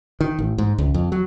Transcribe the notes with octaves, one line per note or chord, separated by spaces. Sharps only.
D#3
A1
G#2
C#2
F2
F#3